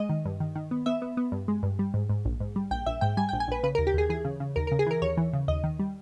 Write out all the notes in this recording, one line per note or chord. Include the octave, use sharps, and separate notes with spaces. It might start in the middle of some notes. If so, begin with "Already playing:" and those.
Already playing: G#3 D#5
D#3
G2
D#3
D#3
B3
B3 E5
B3
B3
G2
G#3
G2
G3
G#2
G#2
A#1
G#2
G3
A#1 G5
A#1 E5
G#2 G5
G3 G#5
G5
A#1
G#5
A#1 B4
C#3 B4
A#4
D#2
G4
D#2 G#4
E3 G#4
C#3
C#3
D#2 A#4
A#4
C#3
G#4
E3 A#4
D#2 C#5
E3
C#3
D#2 D#5
D#3
G3